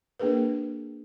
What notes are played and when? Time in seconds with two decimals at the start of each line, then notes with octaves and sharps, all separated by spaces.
0.20 A#3 D4 G#4 A#4 B4